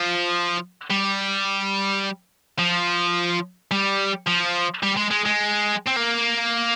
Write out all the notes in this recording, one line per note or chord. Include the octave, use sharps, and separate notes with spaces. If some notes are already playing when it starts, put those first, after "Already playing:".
Already playing: F3
G3
F3
G3
F3
G3
G#3
G#3
G#3
C4
A#3